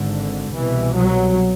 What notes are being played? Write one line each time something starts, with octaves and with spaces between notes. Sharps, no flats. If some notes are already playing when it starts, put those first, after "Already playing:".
Already playing: G#1 G#2 D3
C2 B2 E3
F#3